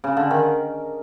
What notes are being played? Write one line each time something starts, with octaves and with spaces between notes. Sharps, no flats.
C#3
D3
D#3